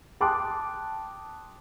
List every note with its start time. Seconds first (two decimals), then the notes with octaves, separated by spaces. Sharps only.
0.21 G5 A5 C6 D6 D#6 F#6